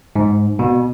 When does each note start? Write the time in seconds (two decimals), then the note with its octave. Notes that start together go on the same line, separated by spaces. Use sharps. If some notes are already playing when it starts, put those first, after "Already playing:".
0.16 G#2
0.59 B2